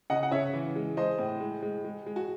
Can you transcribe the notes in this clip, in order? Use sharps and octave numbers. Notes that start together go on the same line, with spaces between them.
C#3 D#5 F#5
F#5
C#3 C#5 E5
E3
G#3
G#3 C5 D#5
A2
G#3
G#3
G#3
G#3
F#4